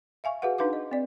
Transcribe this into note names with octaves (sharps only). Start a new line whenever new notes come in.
E5 F5 G#5 C#6
F#4 G#4 B4 F5 F#5
D4 D#4 B4 F5 D6
D#5
C4 D5